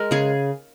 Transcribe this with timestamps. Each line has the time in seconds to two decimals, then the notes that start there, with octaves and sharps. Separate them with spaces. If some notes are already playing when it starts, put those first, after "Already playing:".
Already playing: G#3 A#4
0.11 C#3 G#4